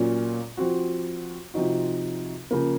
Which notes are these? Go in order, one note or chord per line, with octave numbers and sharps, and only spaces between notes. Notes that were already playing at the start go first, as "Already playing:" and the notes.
Already playing: A#2 F#3 C#4 F4
F3 C4 F#4
C3 F3 C4 D#4 F#4
C#3 F3 A#3